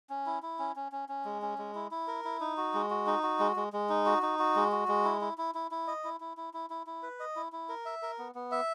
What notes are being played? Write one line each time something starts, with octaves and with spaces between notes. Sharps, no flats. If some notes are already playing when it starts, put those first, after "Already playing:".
C#4
E4
E4
C#4
C#4
C#4
C#4
G#3
C#4
G#3
E4
E4
A#4
E4
D#4
F#4
G#3
F#4
D#4
F#4
G#3
G#3
G#3
D#4
F#4
D#4
F#4
G#3
F#4
G#3
E4
E4
E4
E4
E4
D#5
E4
E4
E4
E4
E4
E4
B4
D#5
E4
E4
A#4
E5
A#4
B3
B3
E5